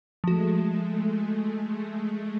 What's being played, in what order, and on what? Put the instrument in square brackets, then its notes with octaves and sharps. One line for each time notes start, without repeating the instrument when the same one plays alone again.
[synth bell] F3 F#4 [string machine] G#3 A3